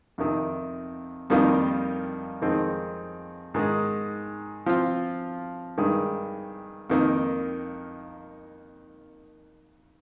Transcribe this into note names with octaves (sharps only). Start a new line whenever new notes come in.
F2 C3 D#3
F2 D#3 G3 A#3 F4
F2 D#3 G#3 C4 D#4
G#2 D#3 G#3
F3 C4 F4
G2 D#3 G#3
F2 D#3 A#3